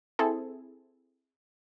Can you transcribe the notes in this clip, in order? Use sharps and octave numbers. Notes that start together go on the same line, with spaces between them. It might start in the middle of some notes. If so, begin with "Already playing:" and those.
C4 E4 G#4 A4